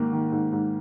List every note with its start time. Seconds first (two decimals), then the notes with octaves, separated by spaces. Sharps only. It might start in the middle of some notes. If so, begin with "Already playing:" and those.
Already playing: G#2 D#3 A#3
0.13 D#3
0.32 G#2
0.52 G#2